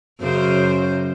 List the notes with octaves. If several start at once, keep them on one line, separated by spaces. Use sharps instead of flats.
F#2 C#3 C5